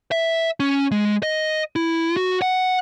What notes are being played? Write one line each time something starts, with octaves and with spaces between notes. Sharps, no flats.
E5
C#4
G#3
D#5
E4
F#4
F#5